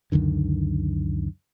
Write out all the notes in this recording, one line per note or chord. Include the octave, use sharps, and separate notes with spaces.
C#2 F#2 D3 D#3